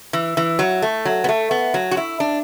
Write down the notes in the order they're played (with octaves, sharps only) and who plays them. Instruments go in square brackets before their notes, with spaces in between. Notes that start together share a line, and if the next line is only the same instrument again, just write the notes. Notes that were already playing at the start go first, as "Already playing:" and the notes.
[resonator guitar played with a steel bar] E3
E3
F#3
A3
F#3
B3
A3
B3
F#3
F#4
E4
D4